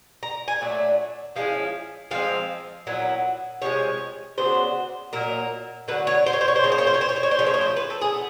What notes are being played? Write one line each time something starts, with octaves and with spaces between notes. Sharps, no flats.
A#5
G#5
A#2 F#3 A3 D4
F3 G#3 C#4 E4 F5
D3 F3 G#3 C4 F5
A#2 F#3 B3 E4
C3 F3 G#3 C#5
C#3 F#3 B3 D4 C5
A#2 F#3 A#3 D#4 A#4
D3 F#3 A3 B4
C#5
C5
C#5
C5
C#5
C5
C#3 F3 A#3 C#5
C5
C#5
C5
C#5
C5
C#5
C5
C#5
C5
C#3 F3 A3 C#5
C5
C#5
C5
B4
A4
G#4
B3